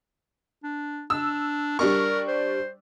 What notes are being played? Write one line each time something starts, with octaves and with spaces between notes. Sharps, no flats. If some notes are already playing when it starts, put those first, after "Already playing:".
D4
D4 E6
G3 D4 A#4 C#6
C5